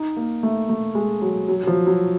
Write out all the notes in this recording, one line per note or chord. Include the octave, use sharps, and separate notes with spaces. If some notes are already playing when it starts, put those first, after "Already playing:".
Already playing: D#4
A#3
A3
A3
G#3
F#3
F#3
F#3
F3
F#3